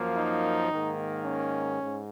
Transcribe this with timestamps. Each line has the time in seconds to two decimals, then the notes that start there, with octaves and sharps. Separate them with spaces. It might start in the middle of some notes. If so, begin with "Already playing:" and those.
Already playing: F#2 F3 A#3
0.17 D#4
0.71 G#2 D#3 A#3
1.25 C#4
1.80 G#2